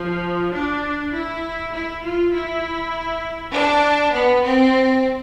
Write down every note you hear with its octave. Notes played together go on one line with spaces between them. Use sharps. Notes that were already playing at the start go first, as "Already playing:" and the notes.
Already playing: F3
D4
E4
E4
F4
E4
D4
B3
C4